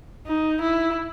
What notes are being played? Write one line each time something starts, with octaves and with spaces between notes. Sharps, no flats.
D#4
E4